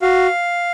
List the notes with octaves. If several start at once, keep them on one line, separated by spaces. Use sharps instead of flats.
F#4 F5